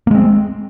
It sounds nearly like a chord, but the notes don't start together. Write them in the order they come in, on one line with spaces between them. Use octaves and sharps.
A#3 G#3 C4